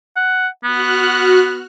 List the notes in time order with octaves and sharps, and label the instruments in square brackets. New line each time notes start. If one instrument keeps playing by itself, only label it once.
[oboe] F#5
[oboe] B3 [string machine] F#4 F6 F#6